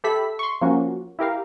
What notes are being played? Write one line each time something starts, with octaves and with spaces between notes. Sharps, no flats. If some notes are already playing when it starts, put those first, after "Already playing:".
G4 A4 E5 B5 B6
C6 C#6
F3 A#3 C#4 F#4
E4 G4 A#4 F5